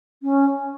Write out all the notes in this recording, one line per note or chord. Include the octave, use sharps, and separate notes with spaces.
C#4